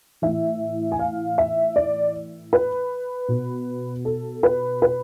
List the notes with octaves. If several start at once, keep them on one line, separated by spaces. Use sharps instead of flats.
A2 E3 E5
G#5
F5
E5
D5
B4
B2
A4
B4
B4